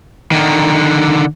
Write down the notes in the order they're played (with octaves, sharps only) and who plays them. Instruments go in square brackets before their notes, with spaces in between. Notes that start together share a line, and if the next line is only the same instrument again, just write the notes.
[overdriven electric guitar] D3 D#3